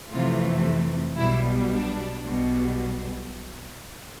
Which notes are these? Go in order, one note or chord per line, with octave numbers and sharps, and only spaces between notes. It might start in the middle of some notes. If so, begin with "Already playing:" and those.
F2 C3 E3 A3 F4
B1 B2 G3 E4
D4
B1 B2 G3